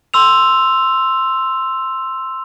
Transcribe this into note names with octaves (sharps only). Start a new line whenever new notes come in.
C6 E6 F7